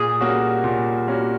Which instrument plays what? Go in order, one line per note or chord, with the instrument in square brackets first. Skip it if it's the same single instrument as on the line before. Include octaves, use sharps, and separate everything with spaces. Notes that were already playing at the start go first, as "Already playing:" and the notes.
Already playing: [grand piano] A#2 [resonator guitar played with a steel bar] G#4
[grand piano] G3 A#3 C#4 F#4
A#2
G3 A#3 C#4 F#4